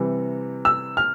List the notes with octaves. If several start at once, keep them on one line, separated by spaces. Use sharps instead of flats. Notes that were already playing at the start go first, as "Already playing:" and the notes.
Already playing: C3 E3 G3
E6
F6